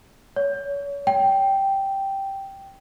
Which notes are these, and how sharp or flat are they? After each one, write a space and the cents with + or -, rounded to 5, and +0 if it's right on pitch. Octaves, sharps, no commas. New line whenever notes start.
C#5 +30
G5 -5